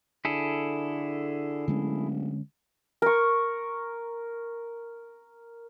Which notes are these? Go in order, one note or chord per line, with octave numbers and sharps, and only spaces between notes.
D3 E4 G#4 A4
D1 D3 G#3 C#4
A#4 C#6